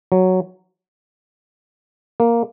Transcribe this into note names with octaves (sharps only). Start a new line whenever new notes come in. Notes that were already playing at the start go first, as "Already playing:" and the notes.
F#3
A#3